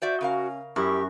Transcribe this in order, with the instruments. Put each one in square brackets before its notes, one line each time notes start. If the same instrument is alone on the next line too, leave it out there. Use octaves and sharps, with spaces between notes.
[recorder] F#4 [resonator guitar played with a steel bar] C5 D5 E5
[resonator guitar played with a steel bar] C#3 A#4 F5 [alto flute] C#4
[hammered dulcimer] F#2 [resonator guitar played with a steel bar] E4 [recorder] G4 [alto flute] C#6